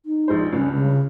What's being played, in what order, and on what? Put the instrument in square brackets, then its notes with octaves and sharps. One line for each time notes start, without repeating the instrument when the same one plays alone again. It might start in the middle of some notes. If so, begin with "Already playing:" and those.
[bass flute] D#4
[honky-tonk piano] A#1 G#3 C5
[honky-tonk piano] C#2 G2 [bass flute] C#4
[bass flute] C#3